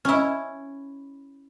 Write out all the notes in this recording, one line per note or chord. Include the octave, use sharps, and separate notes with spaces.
C#4 E4